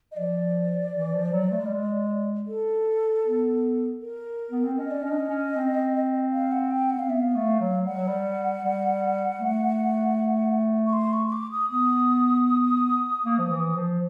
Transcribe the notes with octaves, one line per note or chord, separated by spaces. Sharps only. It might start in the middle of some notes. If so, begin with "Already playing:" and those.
D#5
F3 D5
E3
F3
F#3
A3
G#3
G3
G#3
A4
B3
A#4
B3
C4
C#4 D#5
D5
C#4 D#5
D4
C#4
C#4
C4
F5
F#5
G5
F#5
C4 F5
B3 E5
F5
A3
F#3
G3 F#5
F#3
G3
G3
A3
C#6
C6
C#6
C#6
D6
D#6
B3 D#6
A#3
F3
E3
F3